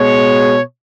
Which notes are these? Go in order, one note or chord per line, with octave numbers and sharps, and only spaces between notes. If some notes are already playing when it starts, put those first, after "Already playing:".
Already playing: B2 G#3 C#5